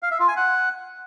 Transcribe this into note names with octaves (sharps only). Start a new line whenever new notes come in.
F5
E5
F4
G#5
F#5